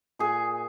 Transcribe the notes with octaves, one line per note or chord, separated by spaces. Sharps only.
A#2 G#4